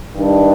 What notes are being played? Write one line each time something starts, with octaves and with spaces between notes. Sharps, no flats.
G2 D#3 G3 D4